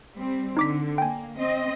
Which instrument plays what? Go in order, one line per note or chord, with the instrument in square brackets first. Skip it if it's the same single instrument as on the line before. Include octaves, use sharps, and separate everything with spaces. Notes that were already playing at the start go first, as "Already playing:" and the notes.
[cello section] G3 C4
[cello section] D3 [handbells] D#4 D6 B6
[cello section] A#3 [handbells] G5 G#5
[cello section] C4 D#5